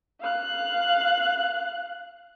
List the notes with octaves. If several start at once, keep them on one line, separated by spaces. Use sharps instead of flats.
F5 F#6